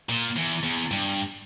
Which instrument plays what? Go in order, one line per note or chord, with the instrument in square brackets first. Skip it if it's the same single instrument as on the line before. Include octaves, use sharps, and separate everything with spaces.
[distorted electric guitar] A#2
E2
E2
G2